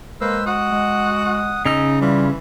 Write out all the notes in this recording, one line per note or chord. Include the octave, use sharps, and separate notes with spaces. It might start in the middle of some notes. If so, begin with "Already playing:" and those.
G#3 A#3 B4 C5 E6
F#4 F#5 D#6
G#3
C#3 D#4 E6
E3 G3 F4